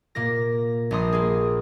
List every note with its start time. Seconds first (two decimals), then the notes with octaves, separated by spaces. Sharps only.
0.15 A#2 A#3 A#4 A#6
0.91 A#1 G3 A#5 C6 D#6
1.12 A#3 G#4